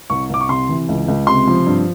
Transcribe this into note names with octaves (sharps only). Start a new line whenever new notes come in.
C2 C#6
C2 D6
C#6
C3 C6
E3
C#2
C#2
C3 C6
F3
G2